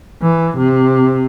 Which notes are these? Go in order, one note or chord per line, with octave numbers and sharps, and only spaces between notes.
E3
C3